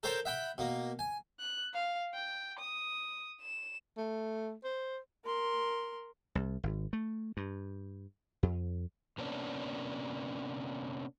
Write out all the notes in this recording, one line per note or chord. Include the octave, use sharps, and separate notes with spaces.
A4 A#4 C5 C#5 G5 A5
E5 F#5 G5 B5
B2 A#3
G#5
F#6
F5
G5
D#6
E7
A3
C5
A#4 C6
C2
G#1
A3
G2
F2
C3 A#3 B3 C#4 D4